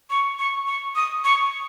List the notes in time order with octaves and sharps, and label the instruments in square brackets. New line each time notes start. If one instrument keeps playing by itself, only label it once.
[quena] C#6
C#6
C#6
D#6
C#6